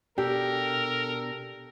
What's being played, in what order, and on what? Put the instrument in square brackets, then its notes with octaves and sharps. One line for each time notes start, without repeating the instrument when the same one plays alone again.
[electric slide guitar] B2 D4 [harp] G4 [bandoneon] A4 [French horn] A#4